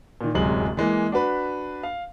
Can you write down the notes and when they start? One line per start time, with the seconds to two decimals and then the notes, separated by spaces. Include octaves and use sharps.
0.21 A#2 D#3
0.35 D1 F#2 C3 G#3 F#7
0.77 E3 G#3 A#3
1.12 D4 F#4 B4 B5
1.83 F5